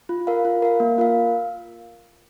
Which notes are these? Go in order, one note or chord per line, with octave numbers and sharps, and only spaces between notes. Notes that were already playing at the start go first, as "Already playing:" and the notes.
F4
A#4 F5
F4
A#4 F5
A#3
F4 A#4 F5